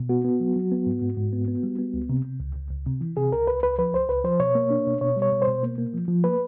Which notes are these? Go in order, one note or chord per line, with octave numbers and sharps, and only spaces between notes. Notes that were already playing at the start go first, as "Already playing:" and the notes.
Already playing: B2
B3 F#4
B3
F#3
F#3
B3
G#2
G#2
G#2
B3
B3
G3
B3
C#2
C3
C3
C#2
C#2
C#2
C3
E3
C3 G#4
C#2 A#4
C#2 B4
C#2 B4
F3 B4
C#2 C5
C#2 B4
F3 C5
B2 C#5
A#3
D4
B2
B2 C#5
G3
C#5
B2
C5
B2
A#3
A#3
F3
F3
A#3 B4